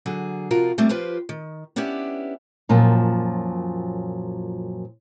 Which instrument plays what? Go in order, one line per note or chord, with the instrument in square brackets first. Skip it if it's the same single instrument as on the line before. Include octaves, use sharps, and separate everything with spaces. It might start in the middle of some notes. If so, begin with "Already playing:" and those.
[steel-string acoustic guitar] D3 F#3 G#4
C3 F3 F4 F#4 A#4
G3 A3 A#3 C4 D4
F3 F4 G4 B4 C5
D#3
B3 C#4 D4 E4 G4 E5
F#2 A#2 F3 F#3